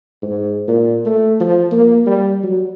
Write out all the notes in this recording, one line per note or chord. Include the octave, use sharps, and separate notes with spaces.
G#2
A#2
A3
F3
A#3
G3
F#3